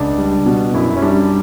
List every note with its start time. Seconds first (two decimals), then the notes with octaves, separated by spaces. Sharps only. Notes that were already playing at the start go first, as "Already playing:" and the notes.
Already playing: C#2 D4
0.18 G3
0.46 B2
0.74 F#2 E4
0.96 C#4
1.02 G3 D4